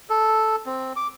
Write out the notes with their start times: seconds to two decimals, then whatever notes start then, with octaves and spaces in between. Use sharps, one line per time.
0.10 A4
0.66 C4
0.96 D6